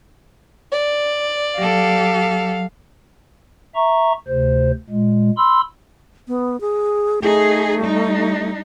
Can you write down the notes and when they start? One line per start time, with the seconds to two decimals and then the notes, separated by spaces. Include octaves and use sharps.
0.72 D5
1.58 F#3 G4 A4 F5
3.75 E5 A#5 C#6
4.28 D2 C3 C5
4.90 A#2 G#3
5.37 B5 C6 E6
6.28 B3
6.61 G#4
7.22 A3 D#4 G#4
7.80 G3 D#4